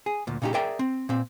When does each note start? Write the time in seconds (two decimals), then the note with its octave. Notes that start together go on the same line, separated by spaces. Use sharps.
0.06 G#4
0.27 D2 A#2
0.42 A#2 C#3 D#4 F4 G4
0.54 G#4 A#4 D5 E5 G5
0.79 C4
1.09 A#2 C4